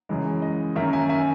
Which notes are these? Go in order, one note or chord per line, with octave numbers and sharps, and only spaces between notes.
F#2 C#3 E3 G#3
D#5
F#2 D#3 A#3 C#4 E5
E5 G#5
E5 G#5